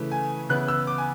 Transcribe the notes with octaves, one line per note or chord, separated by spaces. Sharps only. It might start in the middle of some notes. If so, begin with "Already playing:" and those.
Already playing: C#3 E3 A3
G#5
C#3 E3 B3 E4 F#6
E6
D6
G#5